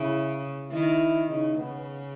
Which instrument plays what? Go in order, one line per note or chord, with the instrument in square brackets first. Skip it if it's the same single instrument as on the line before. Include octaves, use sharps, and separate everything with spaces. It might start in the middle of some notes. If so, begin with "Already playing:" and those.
Already playing: [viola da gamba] C#3 [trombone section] E4
[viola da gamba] D#3 [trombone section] E4
[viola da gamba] C#3 [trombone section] D#4
[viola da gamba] C#3 [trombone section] B3